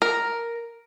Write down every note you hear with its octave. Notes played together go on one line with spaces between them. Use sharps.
A#4